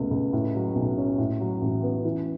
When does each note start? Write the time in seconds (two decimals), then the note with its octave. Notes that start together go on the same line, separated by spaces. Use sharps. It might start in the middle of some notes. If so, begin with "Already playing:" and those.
Already playing: C#2 B2 A3
0.11 C#2
0.33 A2
0.55 F#3
0.75 B1
0.97 C#4
1.18 A2
1.40 F#3
1.62 A1
1.83 B3
2.04 E3